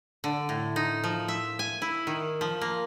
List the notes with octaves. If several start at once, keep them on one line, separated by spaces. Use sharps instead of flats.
D3
A2
D#4
F3
E5
G#5
E4
D#3
F3
A#3